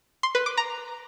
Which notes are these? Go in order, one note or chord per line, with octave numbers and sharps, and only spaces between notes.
C6
B4
D6
A#5